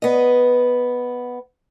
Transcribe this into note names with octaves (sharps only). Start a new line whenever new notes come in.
B3 D#5